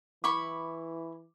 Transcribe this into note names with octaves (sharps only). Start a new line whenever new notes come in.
E3 E4 B5 C#6 D6